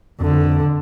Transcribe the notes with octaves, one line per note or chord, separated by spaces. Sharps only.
F2 D3